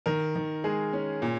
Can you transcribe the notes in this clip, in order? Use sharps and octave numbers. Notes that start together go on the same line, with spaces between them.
D#3 A#4
D#3
G#3 G#4
C#4
A#2